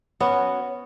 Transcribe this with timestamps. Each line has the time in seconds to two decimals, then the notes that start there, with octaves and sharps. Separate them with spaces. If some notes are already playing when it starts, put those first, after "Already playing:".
0.20 B3 C#4 F#4 C#5